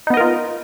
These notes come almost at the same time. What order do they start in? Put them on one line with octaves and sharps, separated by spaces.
D#4 B3 D#5 A#4 F4